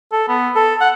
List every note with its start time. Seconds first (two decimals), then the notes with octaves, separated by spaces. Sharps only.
0.12 A4
0.28 B3
0.56 A4
0.81 F#5